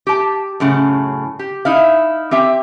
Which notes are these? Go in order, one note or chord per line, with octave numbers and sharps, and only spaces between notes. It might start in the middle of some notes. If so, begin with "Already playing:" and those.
G4 A5
F#2 A2 C#3
G4
D#4 E4 F5
C4 G4 E5 G5